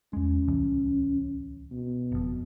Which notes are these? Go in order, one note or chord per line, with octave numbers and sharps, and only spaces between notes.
E2 G#3 C#4
D1 C2 E3
B2
F#1 F2